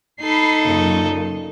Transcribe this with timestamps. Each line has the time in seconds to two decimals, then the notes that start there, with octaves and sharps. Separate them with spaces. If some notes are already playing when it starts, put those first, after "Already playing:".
0.21 D#4 A4 B5 C7
0.66 F#2 A#2 C#3